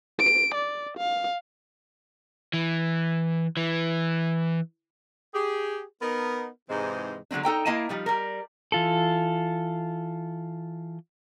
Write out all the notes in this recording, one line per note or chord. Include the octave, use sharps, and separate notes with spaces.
D7
D5
F5
E3
E3
G4 G#4
B3 D#4 A#4
G#2 C3 E3 G#3 C4 D#4
D3 F#3 G#3 C4 D4
D#4 A4 G5 A#5
A#3 E4 D#5 F5 A5
F3 G3 D#4
G3 A#4
E3 F4 A4